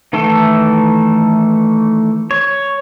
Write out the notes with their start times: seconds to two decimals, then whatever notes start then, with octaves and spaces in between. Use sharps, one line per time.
0.13 D#3 E3 A3 A4
2.31 C#5